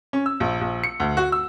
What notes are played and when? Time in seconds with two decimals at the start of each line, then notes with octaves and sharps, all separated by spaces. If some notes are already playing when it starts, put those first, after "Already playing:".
0.13 C#4
0.26 E6
0.40 A#1
0.61 A#1
0.84 C#7
1.00 D2
1.17 F#4
1.32 E6